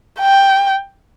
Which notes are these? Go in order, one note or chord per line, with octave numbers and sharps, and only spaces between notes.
G5